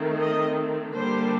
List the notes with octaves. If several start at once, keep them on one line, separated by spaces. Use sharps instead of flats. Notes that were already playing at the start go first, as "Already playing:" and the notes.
Already playing: D#3 A3 C4
D#5
D3 G3 A#3 D4 C5